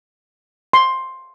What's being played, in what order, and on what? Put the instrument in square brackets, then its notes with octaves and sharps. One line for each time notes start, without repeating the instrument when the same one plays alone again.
[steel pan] C6